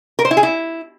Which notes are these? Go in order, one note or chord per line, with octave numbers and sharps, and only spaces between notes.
A#4
C5
E4
G#4
E4